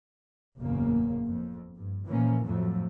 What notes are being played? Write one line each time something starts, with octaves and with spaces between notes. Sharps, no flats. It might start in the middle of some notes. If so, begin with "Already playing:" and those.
F#1 E2 A2 C#3 A#3
F2
G2
A#2 E3 F3 A#3 C#4
F2 A2 F3 F#3 A3